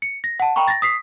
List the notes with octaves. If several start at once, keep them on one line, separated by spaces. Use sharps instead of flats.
C#7
A#6
F#5 A5
G5 A#5 B5 C#6
A6 A#6
D#6 B6 C7